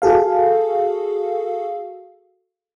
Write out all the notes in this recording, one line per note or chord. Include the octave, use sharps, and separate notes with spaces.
F#4 G#4 A4 F5